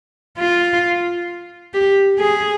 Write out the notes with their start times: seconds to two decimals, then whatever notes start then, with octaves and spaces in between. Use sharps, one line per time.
0.39 F4
1.74 G4
2.19 G#4